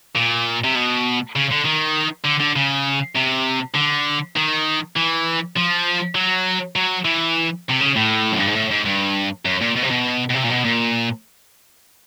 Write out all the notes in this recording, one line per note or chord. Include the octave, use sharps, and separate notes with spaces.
A#2
C3
B2
C#3
D3
D#3
D3
D3
C#3
C3
D3
D#3
E3
F3
F#3
F#3
E3
C3
C#3
A2
F#2
G2
G#2
A2
G#2
G2
F#2
A#2
B2
C3
B2
B2
C3
A#2
B2
A#2